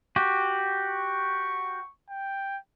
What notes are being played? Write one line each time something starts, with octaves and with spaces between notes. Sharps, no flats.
F#4 G4
C#6
G5